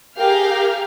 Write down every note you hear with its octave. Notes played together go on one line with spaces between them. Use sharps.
G4 G#4 A#4 F5 G5 F6